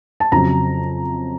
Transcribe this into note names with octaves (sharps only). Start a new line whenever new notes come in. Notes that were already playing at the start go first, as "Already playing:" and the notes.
A5
F2 C#3 F#3 A#5